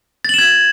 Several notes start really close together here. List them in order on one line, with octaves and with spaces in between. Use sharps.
A6 F#7 E7 G#6